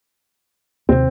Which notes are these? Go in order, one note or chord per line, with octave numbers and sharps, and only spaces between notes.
D#2 C3 C4